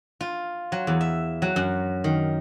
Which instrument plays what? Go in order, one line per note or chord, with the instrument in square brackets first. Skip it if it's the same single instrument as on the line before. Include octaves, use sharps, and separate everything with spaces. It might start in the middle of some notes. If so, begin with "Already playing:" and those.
[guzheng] F4
F#3
E2
E5
F#3
F#2
D#3